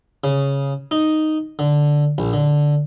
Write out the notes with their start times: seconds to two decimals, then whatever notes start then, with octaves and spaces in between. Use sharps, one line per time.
0.24 C#3
0.91 D#4
1.59 D3
2.18 A#1
2.33 D3